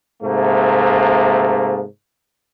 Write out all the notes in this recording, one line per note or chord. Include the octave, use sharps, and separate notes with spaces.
G#2 C3 A3 A#3